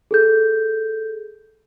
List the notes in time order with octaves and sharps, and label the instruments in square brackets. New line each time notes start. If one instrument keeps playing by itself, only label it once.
[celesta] G#4 A4 G6